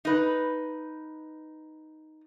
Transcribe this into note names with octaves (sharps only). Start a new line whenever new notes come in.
D#4 B4